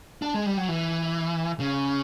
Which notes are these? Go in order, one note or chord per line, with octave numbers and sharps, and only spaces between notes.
D4
G#3
G3
F#3
E3
C#3